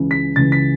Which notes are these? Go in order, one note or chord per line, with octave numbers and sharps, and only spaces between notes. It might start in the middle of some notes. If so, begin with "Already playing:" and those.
Already playing: C#2 C#3 E3
B6
C#2 C#3 E3 A6
B6